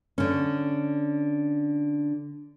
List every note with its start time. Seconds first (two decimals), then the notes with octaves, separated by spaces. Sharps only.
0.18 D3 C#4